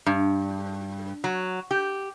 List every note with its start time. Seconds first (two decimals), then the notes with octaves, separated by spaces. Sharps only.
0.06 G2
1.24 F#3
1.71 G4